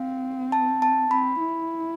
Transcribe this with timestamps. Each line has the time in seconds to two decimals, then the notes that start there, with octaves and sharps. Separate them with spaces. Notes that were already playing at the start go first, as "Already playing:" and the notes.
Already playing: C4 F5
0.52 A5
0.82 A5
1.10 C4 B5
1.40 E4